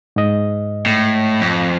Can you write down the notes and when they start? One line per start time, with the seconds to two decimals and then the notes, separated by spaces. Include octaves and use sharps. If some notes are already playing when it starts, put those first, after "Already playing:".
0.16 G#2 D#5
0.86 A2
1.41 F2